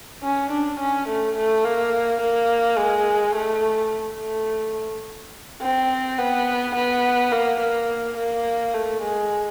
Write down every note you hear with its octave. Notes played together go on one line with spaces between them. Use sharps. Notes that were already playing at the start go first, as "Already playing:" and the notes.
C#4
D4
C#4
A3
A3
A#3
A#3
G#3
A3
A3
C4
B3
B3
A#3
A#3
A#3
A3
G#3